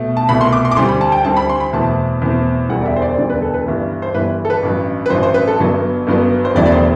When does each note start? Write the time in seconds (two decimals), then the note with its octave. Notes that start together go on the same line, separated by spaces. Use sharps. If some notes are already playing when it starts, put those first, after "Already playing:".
Already playing: B2 A3
0.17 A5
0.29 C2 B2 A3 B5
0.41 C6
0.53 D6
0.65 C6
0.72 D6
0.76 D2 D3 G3 C4 C6
0.89 B5
1.01 A5
1.12 G5
1.25 D2 D3 G3 C4 A5
1.37 B5
1.49 C6
1.60 B5
1.73 E2 B2 A3 C4 A5
2.22 E2 B2 A3 C4
2.69 E1 D2 D3 G3 F#5
2.81 D5
2.86 E5
2.96 C5
3.02 D5
3.09 C5
3.17 E1 D2 D3 G3 D5
3.30 B4
3.42 A4
3.54 B4
3.66 G1 G2 E3 G3
4.02 C5
4.14 G1 G2 E3 G3 B4
4.45 A4
4.50 B4
4.63 A1 G2 F#3
5.06 B4
5.10 A1 G2 F#3 C5
5.23 C5
5.34 B4
5.47 A4
5.60 G1 G2 F#3 B3
6.07 G1 G2 F#3 B3
6.45 C5
6.55 E1 E2 D3 F#3 A3 D5
6.66 D5
6.72 C5